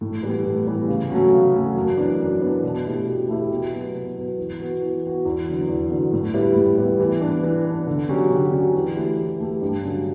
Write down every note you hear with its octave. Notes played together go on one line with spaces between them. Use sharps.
A2
E3 G3 B3
A2
E3 G3 B3
C#3
F#3 A3 C#4 F#4
C#3
F#3 A3 C#4 F#4
F#2
E3 B3 D4
F#2
E3 B3 D4
B2
A3 E4 G4
B2
A3 E4 G4
B2
F#3 B3
B2
F#3 B3
E3
B3 F#4
E3
B3 F#4
E2
D3 F#3
E2
D3 F#3
A2
G3 B3 E4
A2
G3 B3 E4
E3
B3 D4
E3
B3 D4
D3
F#3 C#4 G4
D3
F#3 C#4 G4
E3
A3 E4 G4
E3
A3 E4 G4
G2
D3 F#3 C#4 F#4